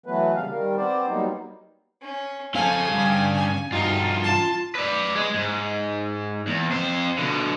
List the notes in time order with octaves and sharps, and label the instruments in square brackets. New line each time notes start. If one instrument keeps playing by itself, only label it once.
[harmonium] E3 F#3 A3 B3 B4
A#2 C#3 G3 F5
D#3 G3 A#4
B3 C4 C5 D5
F#3 G3 A#3 B3 D#4
[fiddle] C#4
[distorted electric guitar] C4 A4 [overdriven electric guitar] C#4 F5 [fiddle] G#5
[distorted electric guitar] G2
[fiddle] G#5
[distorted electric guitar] G2 F#4 [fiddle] D#4 [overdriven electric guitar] F4
[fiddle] A5
[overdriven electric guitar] B4 D5
G#3
G#2
E2
F2 C5
B2 D3